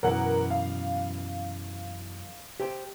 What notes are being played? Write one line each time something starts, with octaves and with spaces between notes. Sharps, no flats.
F#2 B2 E3 A#4 F#5
F5
G4 C5 G5